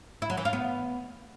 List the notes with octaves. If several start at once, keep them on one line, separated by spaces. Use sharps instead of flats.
E4
F#3
E3
F4
B3